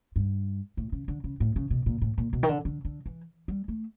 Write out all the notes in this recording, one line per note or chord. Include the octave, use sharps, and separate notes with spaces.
G2
A2
C#3
D3
C#3
A2
C#3
B2
A#2
A2
A#2
B2
D#3
D3
D3
D3
E3
G3
A3